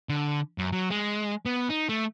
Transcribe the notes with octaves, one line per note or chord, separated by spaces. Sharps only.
D3
F#2
F#3
G#3
B3
D#4
A3